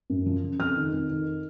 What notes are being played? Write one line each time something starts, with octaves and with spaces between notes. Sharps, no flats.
F#2
F3
C#3
F2 F6
D#3
F2
D#3